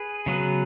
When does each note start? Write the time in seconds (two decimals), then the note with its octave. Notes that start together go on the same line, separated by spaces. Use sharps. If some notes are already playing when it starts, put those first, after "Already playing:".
Already playing: G#4 B4
0.26 C#3 F#3 B3 G#4 B4